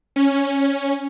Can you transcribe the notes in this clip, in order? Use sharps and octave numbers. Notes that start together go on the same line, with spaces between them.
C#4